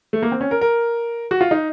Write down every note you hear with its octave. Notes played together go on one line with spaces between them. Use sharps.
A3
A#3
C4
C#4
A#4
A#4
F#4
F4
D#4